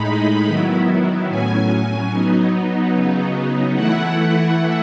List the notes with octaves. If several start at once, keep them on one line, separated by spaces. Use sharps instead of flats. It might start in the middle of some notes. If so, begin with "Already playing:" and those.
Already playing: A2 G#3 D#4 B5
D#3 F#3 B3 E4
A2 F#3 C#4 G#5
F#3 B3 D#4
C#3 F#3 B3 D#4
E3 A3 E4 F#5